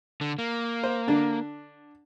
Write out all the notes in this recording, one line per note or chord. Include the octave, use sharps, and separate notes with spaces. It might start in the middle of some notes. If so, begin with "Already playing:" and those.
D3
A#3
C5
D3 D4